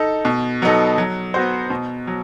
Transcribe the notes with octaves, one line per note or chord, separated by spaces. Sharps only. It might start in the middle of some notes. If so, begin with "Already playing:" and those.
Already playing: D#4 A4
B2
F#3 B3 D#4 A4
F#3
B3 F#4 C5
B2
F#3